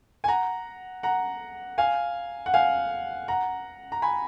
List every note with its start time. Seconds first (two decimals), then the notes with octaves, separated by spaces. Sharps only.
0.24 G#5
0.28 F#5 A#5
1.03 F#5 A#5
1.78 F5 G#5
2.46 F#5
2.54 F5 G#5
3.28 F#5 A#5
3.92 A#5
4.02 G#5 B5